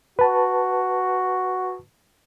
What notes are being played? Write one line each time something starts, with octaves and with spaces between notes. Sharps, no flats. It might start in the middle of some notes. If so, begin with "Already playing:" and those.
F#4 B4 A5